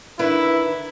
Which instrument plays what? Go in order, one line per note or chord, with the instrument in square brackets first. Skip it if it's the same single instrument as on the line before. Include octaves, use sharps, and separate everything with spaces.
[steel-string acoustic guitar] D3 D#3 B4 [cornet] E4